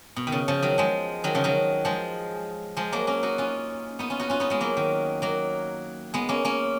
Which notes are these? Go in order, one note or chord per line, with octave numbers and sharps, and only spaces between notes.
B2
D#3
C#3
C#3 F3
D#3 F#3
F3 G#3
D#3 F#3
C#3 F3
D#3 F#3
F3 G#3
F3 G#3
F#3 A#3
A#3 C#4
D#4 F#4
C#4 F4
B3 D#4
C#4 F4
D#4 F#4
C#4 F4
B3 D#4
G#3 B3
F#3 A#3
D#3
F#3 A#3
G#3 B3
A#3 C#4
A#3 C#4